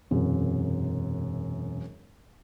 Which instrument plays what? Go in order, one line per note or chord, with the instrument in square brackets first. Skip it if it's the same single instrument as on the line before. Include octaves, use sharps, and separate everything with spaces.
[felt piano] E1 F#2 C3